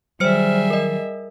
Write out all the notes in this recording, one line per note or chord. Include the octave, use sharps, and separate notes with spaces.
D#3 F#3 G3 G#4 C5 E5 F6 C#7
A#4 D#5